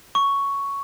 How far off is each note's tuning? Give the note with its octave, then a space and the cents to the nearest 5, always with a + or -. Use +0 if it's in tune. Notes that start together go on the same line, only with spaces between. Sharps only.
C#6 +5